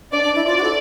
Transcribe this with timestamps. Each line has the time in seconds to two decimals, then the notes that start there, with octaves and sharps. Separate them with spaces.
0.12 D4 D5
0.23 D4
0.35 E4
0.46 F4 D5
0.57 F#4
0.64 A4